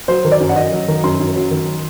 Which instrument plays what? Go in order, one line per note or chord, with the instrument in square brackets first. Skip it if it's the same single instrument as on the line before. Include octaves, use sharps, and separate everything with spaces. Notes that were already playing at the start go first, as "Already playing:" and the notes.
[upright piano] F#3 C5
D#3
D5
F#2
F#5
F#2 D#5
F#3
D#3
F#2 C6
F#2
F#3
D#3